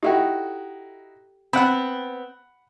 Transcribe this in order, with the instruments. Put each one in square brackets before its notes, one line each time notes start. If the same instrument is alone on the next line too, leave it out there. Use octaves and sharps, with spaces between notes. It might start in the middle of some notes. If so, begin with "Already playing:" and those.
[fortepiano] D#4 E4 F#4 [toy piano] G4 A4 G5
[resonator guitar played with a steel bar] B3 C4 [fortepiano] F#5 B5